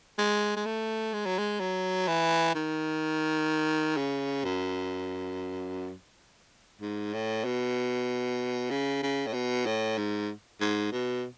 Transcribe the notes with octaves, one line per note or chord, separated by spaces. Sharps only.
G#3
G#3
A3
G#3
F#3
G#3
F#3
E3
D#3
C#3
F#2
G#2
A2
B2
C#3
C#3
A2
B2
A2
G#2
G#2
B2